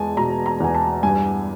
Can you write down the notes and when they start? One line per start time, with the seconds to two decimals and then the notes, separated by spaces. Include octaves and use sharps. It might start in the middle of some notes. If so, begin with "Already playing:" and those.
Already playing: E2 G#3 G#5 A5
0.17 B2 A#5
0.46 A#5
0.60 E2 G#5
0.75 A5
1.03 G2 G#5